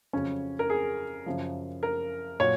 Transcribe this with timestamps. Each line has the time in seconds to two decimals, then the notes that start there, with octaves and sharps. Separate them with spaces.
0.13 F2 C#3 F#3 C#4
0.59 A#4
0.70 G#4
1.26 F#2 C#3 F3
1.83 A#4
2.40 A#2 F#3 C#5